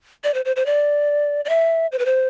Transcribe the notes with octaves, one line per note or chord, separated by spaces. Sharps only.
D5
C5
C5
C5
D5
D5
E5
C5
B4
C5